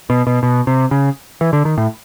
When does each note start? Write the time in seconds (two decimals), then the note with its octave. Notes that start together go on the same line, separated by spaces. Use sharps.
0.10 B2
0.27 B2
0.43 B2
0.67 C3
0.91 C#3
1.41 E3
1.53 D3
1.65 D#3
1.78 A2